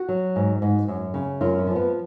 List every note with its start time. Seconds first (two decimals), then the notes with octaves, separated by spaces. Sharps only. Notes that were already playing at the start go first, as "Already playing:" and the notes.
Already playing: F#4
0.09 F#3
0.36 G#2
0.62 G#2
0.88 F#2
1.14 C#3
1.41 F#2 F4
1.58 C#4
1.67 F3
1.75 B3